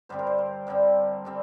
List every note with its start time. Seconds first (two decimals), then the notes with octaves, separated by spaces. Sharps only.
0.09 G2 D3 G3 C4 C5
0.19 A#4
0.27 C5
0.38 A#4
0.67 G2 D3 G3 C4
1.25 D3 G3 C4